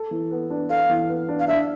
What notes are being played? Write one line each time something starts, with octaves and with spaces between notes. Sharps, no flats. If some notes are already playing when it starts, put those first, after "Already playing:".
Already playing: A4
E3
B3
D4
A4 F5
E3
B3
D4
F5
D4 E5